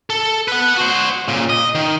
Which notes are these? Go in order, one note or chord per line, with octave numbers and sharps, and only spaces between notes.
A4
B4 F#5
F#4 C5
A#2 C#3
D#5
D#3